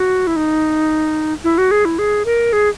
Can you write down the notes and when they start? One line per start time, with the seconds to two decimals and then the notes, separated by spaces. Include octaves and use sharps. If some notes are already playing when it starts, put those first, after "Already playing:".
Already playing: F#4
0.27 E4
0.36 D#4
1.44 E4
1.58 F#4
1.71 G#4
1.85 E4
1.99 G#4
2.25 A#4
2.53 G#4